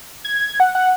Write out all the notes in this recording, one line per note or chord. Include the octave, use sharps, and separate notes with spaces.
G#6
F#5
F#5